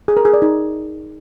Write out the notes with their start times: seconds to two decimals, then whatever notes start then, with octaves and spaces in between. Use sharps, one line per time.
0.08 G#4
0.17 A#4
0.25 G#4
0.33 D5
0.42 D#4